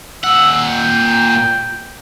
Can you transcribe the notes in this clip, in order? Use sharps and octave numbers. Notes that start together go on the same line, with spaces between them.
A#2 F#5 E6
G5